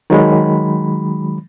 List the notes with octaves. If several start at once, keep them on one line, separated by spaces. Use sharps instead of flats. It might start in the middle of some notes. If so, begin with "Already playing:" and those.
D#3 F#3 G#3 B5